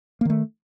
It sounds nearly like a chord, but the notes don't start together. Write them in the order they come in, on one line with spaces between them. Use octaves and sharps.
A#3 D#3 A3